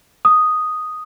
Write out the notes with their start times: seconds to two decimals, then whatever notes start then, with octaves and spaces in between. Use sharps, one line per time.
0.25 D#6